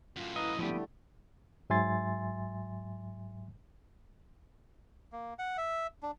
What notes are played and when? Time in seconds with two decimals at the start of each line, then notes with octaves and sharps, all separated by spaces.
0.16 F#2 A2 F4
0.36 E4 B4 D#5 F5 A#5
0.59 D3 F3 G3 A3 B3 G4
1.70 G#2 F#3 E5 G#5 C6 A6
5.12 A#3
5.39 F#5
5.58 E5
6.03 D4